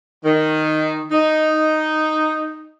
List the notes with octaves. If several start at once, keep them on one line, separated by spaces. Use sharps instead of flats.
D#3
D#4